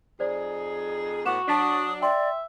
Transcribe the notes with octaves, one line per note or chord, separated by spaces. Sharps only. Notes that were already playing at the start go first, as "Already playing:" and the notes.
F2 D#4 G#4 C5 D5
A2 B3 F#4 F#5 D6 E7
F#3 D4 A5 D#6 A6 B6
D5 E5 G5 C6